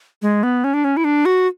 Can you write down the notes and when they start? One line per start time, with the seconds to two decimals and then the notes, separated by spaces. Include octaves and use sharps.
0.22 G#3
0.43 B3
0.64 C#4
0.74 D4
0.84 C#4
0.97 E4
1.04 D4
1.25 F#4